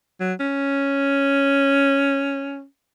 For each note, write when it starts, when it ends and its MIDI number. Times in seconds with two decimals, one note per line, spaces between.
0.20 0.33 54
0.40 2.64 61